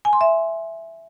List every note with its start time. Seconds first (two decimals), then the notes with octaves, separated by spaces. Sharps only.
0.05 G#5
0.13 C6
0.21 E5